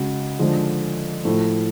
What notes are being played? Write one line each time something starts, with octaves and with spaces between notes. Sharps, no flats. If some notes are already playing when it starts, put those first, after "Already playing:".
Already playing: C#3 G#3 F#4
D3 F3 G#3 D4
A2 F3 A3